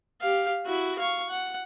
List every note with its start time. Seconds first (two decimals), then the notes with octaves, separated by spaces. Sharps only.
0.21 G4 F5
0.66 E4 F#4
0.99 F5 C#6
1.30 F#5